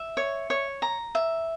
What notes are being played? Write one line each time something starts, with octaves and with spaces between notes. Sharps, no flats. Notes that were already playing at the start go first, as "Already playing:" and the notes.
Already playing: E5
C#5
C#5
A#5
E5